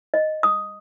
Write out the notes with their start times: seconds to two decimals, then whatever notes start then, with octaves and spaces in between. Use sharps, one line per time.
0.14 D#5
0.43 D#6